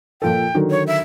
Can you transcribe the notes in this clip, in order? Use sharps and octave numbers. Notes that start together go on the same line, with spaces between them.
A#2 F3 A4 G5
D3 D#3 F#3
C#5
E5